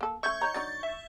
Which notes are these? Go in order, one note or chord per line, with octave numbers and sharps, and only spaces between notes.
A#3 A4
A3 C#4 E5 C#6 G6 G#6
D#3 C#5 A#5
F#3 D4 D#4 A6
E5